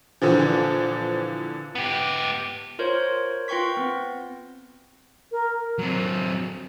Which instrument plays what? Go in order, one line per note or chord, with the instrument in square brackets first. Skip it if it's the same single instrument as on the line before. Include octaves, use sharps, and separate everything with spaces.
[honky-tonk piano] A#2 D3 E3 F3
[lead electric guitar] B3 G4
[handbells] F4 A#4 C5 C#5
F4 B4 G5 C6 C#6 B6
B3 C4
[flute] A#4
[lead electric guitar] F#3 C4